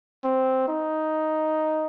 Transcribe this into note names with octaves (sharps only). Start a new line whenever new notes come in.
C4
D#4